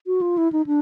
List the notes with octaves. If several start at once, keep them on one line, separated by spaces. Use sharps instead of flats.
F#4
F4
E4
D#4
D4